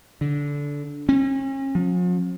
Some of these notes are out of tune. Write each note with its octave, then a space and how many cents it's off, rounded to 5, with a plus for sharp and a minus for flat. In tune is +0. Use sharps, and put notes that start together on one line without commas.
D3 -20
C#4 -40
F3 +45